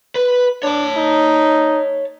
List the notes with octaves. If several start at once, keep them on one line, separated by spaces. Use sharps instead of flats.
B4
D4 C#5 A5
D#4